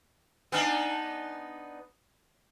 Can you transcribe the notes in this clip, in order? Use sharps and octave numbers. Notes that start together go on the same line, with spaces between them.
B3 D4 D#4 G#5 D#6 F6